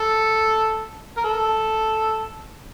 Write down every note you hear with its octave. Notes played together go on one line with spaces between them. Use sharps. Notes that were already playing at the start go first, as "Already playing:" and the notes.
Already playing: A4
A#4
A4